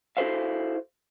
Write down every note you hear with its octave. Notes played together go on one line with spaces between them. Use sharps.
E4 F#4 A4 C5 E5 F5